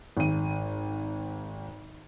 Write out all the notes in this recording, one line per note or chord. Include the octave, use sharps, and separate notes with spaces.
G#1 D#7